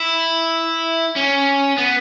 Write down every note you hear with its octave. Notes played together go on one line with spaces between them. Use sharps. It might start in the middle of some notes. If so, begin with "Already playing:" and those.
Already playing: E4
C#4
B3